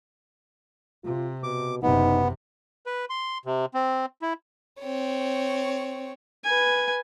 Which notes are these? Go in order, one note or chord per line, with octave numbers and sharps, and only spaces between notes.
C3 F4
B2 D6
F#1 C3 B3 D#4
B4
C6
C3
C4
E4
C4 C#5
B4 G#5